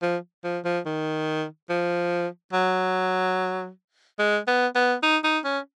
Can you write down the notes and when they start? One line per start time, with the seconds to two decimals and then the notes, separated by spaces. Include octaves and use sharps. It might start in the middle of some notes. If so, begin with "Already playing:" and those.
0.02 F3
0.44 F3
0.65 F3
0.86 D#3
1.69 F3
2.53 F#3
4.19 G#3
4.47 B3
4.75 B3
5.03 D#4
5.24 D#4
5.44 C#4